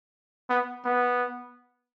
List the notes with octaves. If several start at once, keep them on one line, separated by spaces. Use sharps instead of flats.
B3
B3